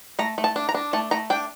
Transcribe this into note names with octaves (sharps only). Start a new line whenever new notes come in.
A3 A#5
A3
A5
D4
A#5
D4
A3 A5
A3 A#5
D4 G5